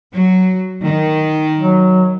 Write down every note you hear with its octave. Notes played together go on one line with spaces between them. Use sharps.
F#3
D#3
F#3